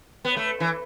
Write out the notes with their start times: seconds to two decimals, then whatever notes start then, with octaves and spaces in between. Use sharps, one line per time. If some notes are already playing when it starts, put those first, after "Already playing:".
0.25 B3
0.37 A3
0.60 E3